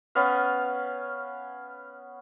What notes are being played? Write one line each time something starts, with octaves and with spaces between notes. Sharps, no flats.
B3 C#4 F5